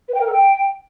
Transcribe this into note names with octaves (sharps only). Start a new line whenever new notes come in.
B4
G5
A#4
A4
G5